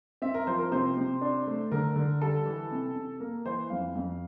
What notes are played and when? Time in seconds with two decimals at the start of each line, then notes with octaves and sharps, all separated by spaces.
0.22 C4 E5
0.34 A#4
0.47 F3 C5
0.59 A#4
0.71 C3 C5
0.97 C3
1.21 D4
1.47 A3
1.72 D3 A#4
1.96 D3
2.21 G3 A4
2.46 E3
2.71 C3
2.95 C3
3.20 A#3 A#4
3.45 E3 C5
3.70 F2 F5
3.95 F2